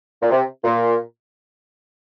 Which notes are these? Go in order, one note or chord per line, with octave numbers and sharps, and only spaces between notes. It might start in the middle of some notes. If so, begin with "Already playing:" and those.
A#2
C3
A#2